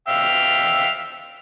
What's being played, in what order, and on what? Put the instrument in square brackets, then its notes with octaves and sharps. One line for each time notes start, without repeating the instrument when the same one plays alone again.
[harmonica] E5 F5 G5